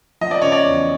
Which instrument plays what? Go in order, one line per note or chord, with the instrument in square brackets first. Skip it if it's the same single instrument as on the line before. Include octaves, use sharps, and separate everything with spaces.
[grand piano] F3 D#5
D5
C#3 C#5
D5
E2